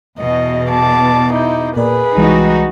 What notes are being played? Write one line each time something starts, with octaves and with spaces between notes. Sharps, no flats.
E2 B2 D#5
A5 D6
D#4 E4 D6 G6
A#2 G#4 A#4 B4 D5
C2 E3 G3 G#3 D#4 F#4